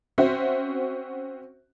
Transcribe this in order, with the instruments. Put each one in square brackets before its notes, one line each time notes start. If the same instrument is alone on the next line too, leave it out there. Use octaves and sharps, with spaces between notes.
[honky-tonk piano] C4 C#4 F#4 C5 E5